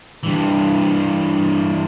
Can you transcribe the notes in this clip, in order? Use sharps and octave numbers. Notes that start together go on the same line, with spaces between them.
G2 E3